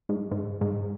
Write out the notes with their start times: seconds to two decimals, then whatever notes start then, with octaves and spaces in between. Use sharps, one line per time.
0.09 G#2
0.31 G#2
0.61 G#2